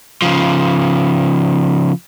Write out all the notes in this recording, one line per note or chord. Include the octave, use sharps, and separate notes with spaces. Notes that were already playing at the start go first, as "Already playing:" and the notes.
C#3 F3